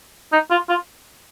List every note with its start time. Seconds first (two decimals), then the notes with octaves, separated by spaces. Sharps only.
0.33 D#4
0.51 F4
0.69 F4